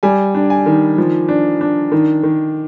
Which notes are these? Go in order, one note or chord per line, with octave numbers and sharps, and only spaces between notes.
G3 G#5
D4
G#5
D#3
F3
D4
D4
D#3
D#3